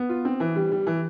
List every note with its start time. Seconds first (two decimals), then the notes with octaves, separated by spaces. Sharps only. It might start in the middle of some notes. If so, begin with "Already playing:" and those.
Already playing: B3
0.09 F4
0.25 C4
0.40 E3
0.56 G3
0.72 G3
0.87 E3